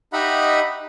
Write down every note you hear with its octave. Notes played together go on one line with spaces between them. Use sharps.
D#4 G4 D#5 E5 F#5 B5